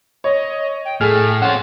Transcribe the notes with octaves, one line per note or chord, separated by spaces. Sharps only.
C#5 D#5
G5
A2 G#4 A4 F6
C4 C#4 F4 F#5